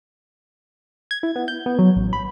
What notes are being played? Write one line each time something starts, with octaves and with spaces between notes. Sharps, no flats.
G#6
E4
B3
G6
B3
F#3
A1
B5